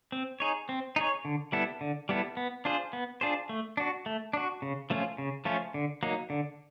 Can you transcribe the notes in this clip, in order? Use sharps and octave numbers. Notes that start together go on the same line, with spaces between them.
C4
D#4 G#4 C#5
C4
D#4 G#4 C#5
D3
G3 B3 E4 A4
D3
G3 B3 E4 A4
B3
D4 F4 G#4 C5
B3
D4 F4 G#4 C5
A3
D4 F#4
A3
D4 F#4
C#3
F3 A3 C#4 F4
C#3
F3 A3 C#4 F4
D3
F#3 A#3 D#4
D3